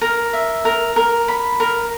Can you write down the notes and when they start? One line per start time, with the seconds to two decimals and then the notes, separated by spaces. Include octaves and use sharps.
0.01 A#4
0.33 E5
0.65 A#4
0.96 A#4
1.28 B5
1.60 A#4